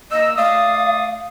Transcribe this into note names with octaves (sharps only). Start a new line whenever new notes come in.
A#3 D#5 E6
A3 D5 F5 D#6